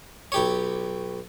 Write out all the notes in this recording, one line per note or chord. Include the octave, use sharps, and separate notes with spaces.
B1 G4 C#5